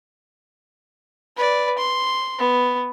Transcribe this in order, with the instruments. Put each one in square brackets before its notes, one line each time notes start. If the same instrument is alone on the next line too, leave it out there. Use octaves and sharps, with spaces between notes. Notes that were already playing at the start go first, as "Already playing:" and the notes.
[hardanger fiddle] B4 D5
C6
B3